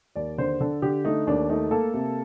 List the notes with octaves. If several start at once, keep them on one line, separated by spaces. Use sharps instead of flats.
D#2 D5
D3 C5
D3 A4
D3 G4
A3 D#4
D#2 D4
A3 D#4
A#3 A4
C3